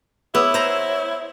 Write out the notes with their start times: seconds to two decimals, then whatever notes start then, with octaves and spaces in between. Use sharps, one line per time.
0.35 B3 E4 G#4 C#5 E6
0.54 C5 A#5